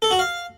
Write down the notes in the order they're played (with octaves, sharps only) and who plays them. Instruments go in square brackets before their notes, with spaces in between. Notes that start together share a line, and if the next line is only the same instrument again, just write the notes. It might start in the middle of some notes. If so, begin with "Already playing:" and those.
[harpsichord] A4
F#4
F5